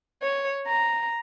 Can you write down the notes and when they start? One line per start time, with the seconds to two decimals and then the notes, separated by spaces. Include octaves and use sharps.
0.22 C#5
0.67 A#5